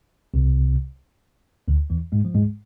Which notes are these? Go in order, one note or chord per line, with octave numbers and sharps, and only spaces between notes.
C2 C3
D2 D3
E2 E3
G#2 G#3
F3
G#2 G#3